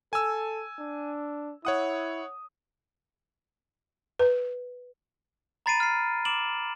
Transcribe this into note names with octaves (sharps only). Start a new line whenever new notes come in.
A4 G#5 E6
D4
E4 C#5 F#5 D#6
B4
A#5 B5 A6 C7 D7 D#7
F6 C7
D6 D7 E7 F#7